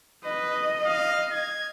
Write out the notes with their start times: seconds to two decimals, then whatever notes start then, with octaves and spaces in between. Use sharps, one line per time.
0.24 B4 D#5
0.86 F5
1.31 G#6